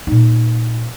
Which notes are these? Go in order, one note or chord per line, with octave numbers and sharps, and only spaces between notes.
A#2 D#4